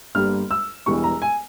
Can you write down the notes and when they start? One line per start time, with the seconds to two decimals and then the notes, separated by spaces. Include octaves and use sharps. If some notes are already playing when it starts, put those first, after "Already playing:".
0.15 G1 G2 G3 A#3 F6
0.51 E6
0.86 E1 E2 E3 G3 C#6
1.04 A#5
1.22 G#5